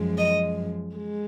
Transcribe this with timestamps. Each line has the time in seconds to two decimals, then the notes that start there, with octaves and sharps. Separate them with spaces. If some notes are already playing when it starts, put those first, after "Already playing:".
Already playing: F#2 F3 G#3
0.19 D#5
0.97 G#3